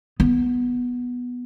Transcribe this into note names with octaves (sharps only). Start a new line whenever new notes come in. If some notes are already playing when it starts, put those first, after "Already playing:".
B3